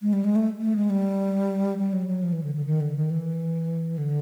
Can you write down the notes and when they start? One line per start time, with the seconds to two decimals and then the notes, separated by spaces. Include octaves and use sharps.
0.02 G#3
0.13 G3
0.24 G#3
0.36 A3
0.61 A3
0.76 G#3
0.90 G3
1.78 G3
1.93 F#3
2.07 F#3
2.23 F3
2.33 E3
2.43 D3
2.55 D3
2.66 D#3
2.81 D3
2.96 D#3
3.10 E3
3.98 D3